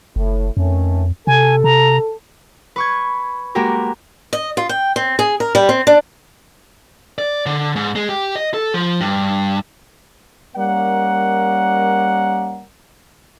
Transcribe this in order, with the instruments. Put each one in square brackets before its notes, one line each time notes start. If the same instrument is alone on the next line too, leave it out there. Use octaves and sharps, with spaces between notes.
[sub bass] F#1 [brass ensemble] A2
[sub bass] F2 [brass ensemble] D#3 A3 C#4
[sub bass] C3 [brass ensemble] A4 [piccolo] G#5
[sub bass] C3 [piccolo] A#5
[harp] B4 C#6 G#6
G#3 A#3 F#4 G4 A#4
[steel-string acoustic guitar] D#5
F4
G5
C4
G#4
A#4
G3
C4
D4
[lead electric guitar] D5
D3
G#2
G#3
G4
D#5
A4
F3
G2
[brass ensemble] G3 A#3 C#4 A#4 D5 F#5